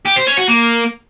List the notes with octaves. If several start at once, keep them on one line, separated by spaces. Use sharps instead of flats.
G4
C5
C#4
F#4
A#3